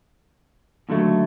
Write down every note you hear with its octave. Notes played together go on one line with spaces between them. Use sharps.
D#2 D3 F#3 A3